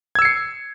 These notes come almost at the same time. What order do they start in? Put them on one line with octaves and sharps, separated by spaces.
G#6 E6 C#7 C7